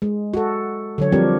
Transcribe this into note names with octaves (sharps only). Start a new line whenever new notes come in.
G#3
F#4 A4
D3 F#3 C#5
F3 G3 C4 D4 G4 A#4